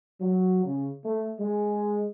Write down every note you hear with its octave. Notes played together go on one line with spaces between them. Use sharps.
F#3
C#3
A3
G#3